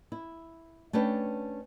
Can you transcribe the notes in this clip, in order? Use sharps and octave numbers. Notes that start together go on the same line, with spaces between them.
E4
A3 C#4 D4 B4 G5